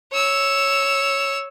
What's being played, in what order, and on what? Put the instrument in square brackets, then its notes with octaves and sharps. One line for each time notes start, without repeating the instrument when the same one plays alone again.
[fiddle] C#5 E6